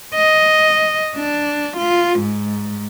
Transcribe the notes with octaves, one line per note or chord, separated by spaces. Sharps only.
D#5
D4
F4
G#2